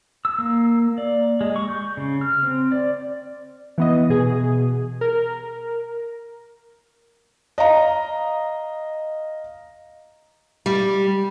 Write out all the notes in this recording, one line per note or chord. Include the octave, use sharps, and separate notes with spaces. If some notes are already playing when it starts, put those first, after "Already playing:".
E6
A#3
D5
G#3
C#6
G6
C#3
F6
C4
D5
E3 B3 D#5
B2 G#4
A#4
D#5 F5 A#5
G3